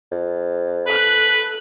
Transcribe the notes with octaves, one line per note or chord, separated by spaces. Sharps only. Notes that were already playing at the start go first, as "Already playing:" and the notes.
F2
A4 B4 F#6